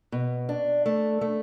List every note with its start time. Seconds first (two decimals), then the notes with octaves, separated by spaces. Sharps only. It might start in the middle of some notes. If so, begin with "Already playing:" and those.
0.12 B2
0.49 D4
0.86 A3
1.21 A3